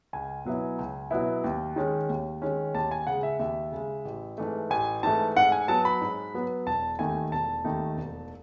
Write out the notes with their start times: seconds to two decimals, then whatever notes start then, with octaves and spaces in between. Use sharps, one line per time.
0.13 C#2 G#5
0.45 B2 F#3 B3 E4
0.79 C#2
1.11 B2 F#3 B3 E4
1.44 D#2
1.76 D#3 G#3 C#4
2.09 D#2
2.42 D#3 G#3 C#4
2.74 D#2 A5
2.91 G#5
3.07 C#3 G#3 F#5
3.23 E5
3.39 D#2 E5
3.72 C#3 G#3
4.05 A1
4.38 G#2 E3 A3
4.70 A1 G#5
5.03 G#2 E3 A3 A5
5.37 G#2 F#5
5.52 G#5
5.68 F#3 B3 A5
5.85 B5
6.01 G#2
6.34 F#3 B3
6.66 E1 A5
6.99 D#2 D#3 A3 D#4 G#5
7.32 E1 A5
7.64 D#2 D#3 A3 D#4
7.97 E1